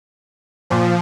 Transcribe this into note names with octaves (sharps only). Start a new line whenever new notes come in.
A#2 F3